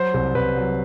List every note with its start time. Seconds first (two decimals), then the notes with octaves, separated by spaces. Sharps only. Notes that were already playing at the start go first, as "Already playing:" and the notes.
Already playing: F#3 C5
0.14 C2
0.34 C2 B4
0.56 F#3